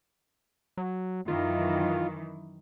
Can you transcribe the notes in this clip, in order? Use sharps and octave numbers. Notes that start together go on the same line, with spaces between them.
F#3
F#2 D#3 E3 F4